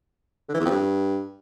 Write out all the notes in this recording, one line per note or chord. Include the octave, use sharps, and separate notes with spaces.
D3
E3
E2
F2
G2